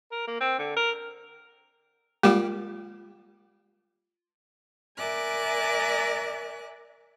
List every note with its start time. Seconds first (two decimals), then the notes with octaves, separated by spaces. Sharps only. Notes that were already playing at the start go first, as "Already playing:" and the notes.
0.12 A#4
0.27 A#3
0.40 C4
0.58 D3
0.76 A#4
2.23 G3 G#3 A#3 F4 G4
4.97 A#4 D5 E5 G#5 D6 F#6